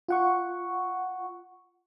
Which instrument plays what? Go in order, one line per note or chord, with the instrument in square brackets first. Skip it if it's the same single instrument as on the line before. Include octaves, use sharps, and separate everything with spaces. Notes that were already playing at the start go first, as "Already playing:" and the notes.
[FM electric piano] F4 F#5 C#6